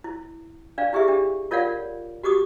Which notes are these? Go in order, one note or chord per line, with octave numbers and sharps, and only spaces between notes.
E4
D4 D5 F5
E4 G4 G#4 E5
D4 G4
F4 A#4 C#5 D5 F5 F#5
F#4 G4 D6 D#6